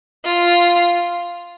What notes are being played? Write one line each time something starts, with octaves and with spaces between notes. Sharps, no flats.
F4